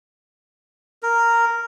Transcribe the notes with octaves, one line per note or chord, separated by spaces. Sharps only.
A#4